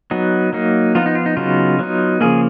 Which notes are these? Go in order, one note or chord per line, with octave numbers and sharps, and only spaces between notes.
F#3 B3 D#4
F#3 A#3 D#4
F3 B3 D#4 F4
D#4
F4
D#4
C#3 F#3 B3 D#4 F4
F#3 B3 D#4
C#3 F3 A#3 G#4